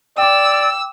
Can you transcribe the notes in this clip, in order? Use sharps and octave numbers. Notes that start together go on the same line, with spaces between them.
D5 G5 D6 E6